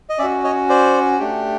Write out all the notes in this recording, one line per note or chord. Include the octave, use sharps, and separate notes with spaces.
D#5
C#4 F#4 D5 E5
C#5 D#5
C5 D5
A3 D4 G4